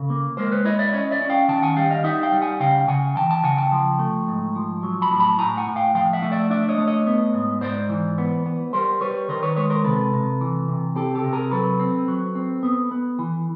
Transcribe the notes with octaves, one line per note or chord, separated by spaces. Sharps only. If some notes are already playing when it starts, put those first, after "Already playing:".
Already playing: C#3 A4
A#3
G#3 A#4 C5
B4 C#5
E4 C#5 D#5
D5 E5
C#4 C#5 D#5
D5 E5
C#4
F5 G5
D#3 G5 A5
F#5 G#5
G3 F5 G5
D#5 F5
D#4 E5 F#5
F5 G5
G3
F#5 G#5
C#3 F5 G5
C#3 F#5 G#5
E3 G5 A5
G5 A5
C#3 F#5 G#5
G5 A5
F3
A3
G#2
F3
F#3
A5 B5
A2
A5 B5
A2 G#5 A#5
F#5 G#5
A2
F5 G5
F3 F5 G5
E5 F#5
A3
D5 E5
D4 D5 E5
C#5 D#5
A3
C#5 D#5
B3
G#2
G#2 C5 D5
E3
B3
B3
G3 A#4 C5
G3 B4 C#5
D#3 A#4 C5
B4 C#5
G#3 B4 C#5
A#4 C5
C3 A4 B4
C3
E3
C3
C4 G4 A4
G4 A4
C3
G#4 A#4
F#3 A4 B4
C4
F#3
C4
B3
B3
E3